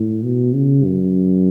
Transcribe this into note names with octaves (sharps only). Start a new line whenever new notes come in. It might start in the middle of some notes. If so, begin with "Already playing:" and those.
Already playing: A2
B2
C#3
F#2